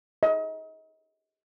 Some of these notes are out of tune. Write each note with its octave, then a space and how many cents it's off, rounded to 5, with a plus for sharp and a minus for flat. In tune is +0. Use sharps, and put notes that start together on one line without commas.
D#5 +35